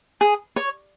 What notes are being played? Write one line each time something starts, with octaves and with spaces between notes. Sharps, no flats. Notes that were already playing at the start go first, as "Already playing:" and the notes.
G#4
C#5